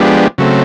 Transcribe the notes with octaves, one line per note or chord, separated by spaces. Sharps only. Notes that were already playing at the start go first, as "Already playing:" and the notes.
Already playing: F3 G#3 B3 D4 G4
C#3 F#3 A3 C4